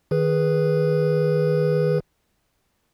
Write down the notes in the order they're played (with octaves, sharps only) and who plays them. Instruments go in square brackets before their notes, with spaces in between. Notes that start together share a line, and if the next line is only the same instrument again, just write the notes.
[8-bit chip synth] D#3 G#4 B4